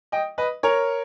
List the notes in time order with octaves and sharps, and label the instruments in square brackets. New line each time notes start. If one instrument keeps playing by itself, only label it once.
[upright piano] D#5 G5
B4 D#5
A#4 C#5